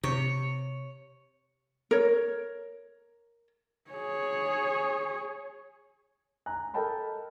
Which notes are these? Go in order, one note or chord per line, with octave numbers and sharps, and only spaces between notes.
C3 C#5
A#4 C#5
G#4 C#5
G#5 A#5 F#6
A4 A#4 D#5 G5 A5 B5